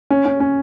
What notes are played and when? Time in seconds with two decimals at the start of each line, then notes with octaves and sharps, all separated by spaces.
0.10 C#4
0.25 C#4
0.40 C#4